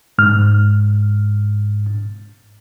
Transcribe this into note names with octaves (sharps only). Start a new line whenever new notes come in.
G#2 F6